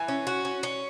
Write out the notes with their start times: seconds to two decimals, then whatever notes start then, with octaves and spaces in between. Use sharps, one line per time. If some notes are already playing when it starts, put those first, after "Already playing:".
Already playing: E3 G#5
0.08 C#4
0.27 F#4
0.45 C#4
0.63 C#4